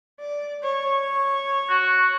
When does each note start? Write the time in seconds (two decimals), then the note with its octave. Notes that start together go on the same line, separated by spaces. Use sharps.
0.20 D5
0.63 C#5
1.70 F#4